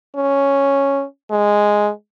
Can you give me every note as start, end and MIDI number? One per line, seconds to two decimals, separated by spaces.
0.16 1.04 61
1.31 1.91 56